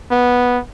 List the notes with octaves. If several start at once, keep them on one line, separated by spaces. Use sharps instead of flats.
B3